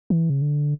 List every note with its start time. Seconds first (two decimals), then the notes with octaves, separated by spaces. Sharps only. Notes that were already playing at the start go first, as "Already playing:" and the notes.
0.10 E3
0.30 C#3
0.42 D3